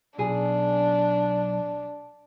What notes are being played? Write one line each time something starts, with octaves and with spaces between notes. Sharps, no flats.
B1 D4 G#4